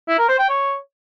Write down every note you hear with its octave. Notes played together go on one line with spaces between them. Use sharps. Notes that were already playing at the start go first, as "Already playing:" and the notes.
E4
A#4
C5
G5
C#5